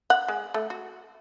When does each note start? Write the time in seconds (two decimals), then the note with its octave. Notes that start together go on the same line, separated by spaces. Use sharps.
0.10 F#5
0.28 G#3
0.54 A3
0.70 F#4